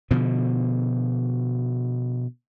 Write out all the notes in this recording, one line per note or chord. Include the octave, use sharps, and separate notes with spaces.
B2 D3 F3